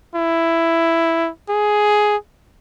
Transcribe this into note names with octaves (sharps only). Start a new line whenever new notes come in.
E4
G#4